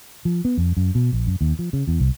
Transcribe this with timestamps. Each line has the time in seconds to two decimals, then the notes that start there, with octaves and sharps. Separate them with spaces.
0.25 F3
0.45 B3
0.58 F2
0.77 F#2
0.95 B2
1.13 A#1
1.27 F#2
1.41 D#2
1.59 F3
1.73 C#3
1.88 E2
2.00 C2